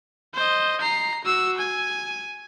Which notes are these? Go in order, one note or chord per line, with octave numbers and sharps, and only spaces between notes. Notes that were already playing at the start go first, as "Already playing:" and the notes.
C5 D#5
A#5 C7
F#4 E6
G#5